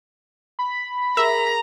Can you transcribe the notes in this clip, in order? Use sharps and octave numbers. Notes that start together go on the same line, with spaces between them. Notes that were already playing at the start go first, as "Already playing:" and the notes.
B5
G#4 A#4 E5 A#5